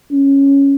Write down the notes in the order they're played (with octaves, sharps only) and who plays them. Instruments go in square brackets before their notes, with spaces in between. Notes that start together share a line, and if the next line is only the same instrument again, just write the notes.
[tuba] C#4